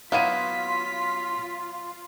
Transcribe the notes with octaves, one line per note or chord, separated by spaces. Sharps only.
F#3 B3 E4 F4 F5 B6 D#7